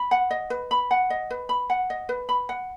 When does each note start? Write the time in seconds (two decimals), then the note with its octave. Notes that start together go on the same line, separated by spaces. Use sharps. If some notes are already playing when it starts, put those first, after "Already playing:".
Already playing: B5
0.11 F#5
0.31 D#5
0.50 B4
0.71 B5
0.91 F#5
1.10 D#5
1.30 B4
1.49 B5
1.70 F#5
1.90 D#5
2.09 B4
2.29 B5
2.49 F#5